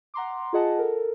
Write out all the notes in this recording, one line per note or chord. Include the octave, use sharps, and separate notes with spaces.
F#5 A#5 C6 D6
F4 G#4 D#5 F#5 A5
A4 A#4